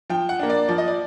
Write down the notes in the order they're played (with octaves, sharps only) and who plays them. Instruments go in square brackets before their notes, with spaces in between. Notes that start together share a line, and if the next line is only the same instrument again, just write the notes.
[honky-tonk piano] F3 G5
F#5
A#3 D4
D5
F3 D5
D#5
D5